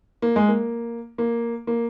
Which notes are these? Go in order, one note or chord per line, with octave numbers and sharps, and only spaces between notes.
A#3
G#3
A#3
A#3
A#3